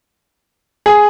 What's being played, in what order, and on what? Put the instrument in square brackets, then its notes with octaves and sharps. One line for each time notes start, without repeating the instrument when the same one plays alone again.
[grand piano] G#4